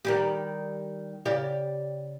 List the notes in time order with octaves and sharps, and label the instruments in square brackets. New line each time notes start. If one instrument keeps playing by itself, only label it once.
[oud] D#3 G3 G4
C#3 G4 D5